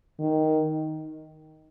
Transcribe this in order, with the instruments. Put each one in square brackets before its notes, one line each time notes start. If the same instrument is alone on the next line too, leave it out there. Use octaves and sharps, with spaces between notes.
[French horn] D#3